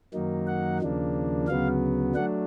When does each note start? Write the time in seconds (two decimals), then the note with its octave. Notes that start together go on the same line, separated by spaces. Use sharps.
0.14 F#2 D#3 F#3 A#3 D#4
0.47 F#5
0.80 D#2 C#3 F3 A#3 D4
1.48 D2 C#3 F#3 B3 F5
2.15 F#3 A3 D4 F#5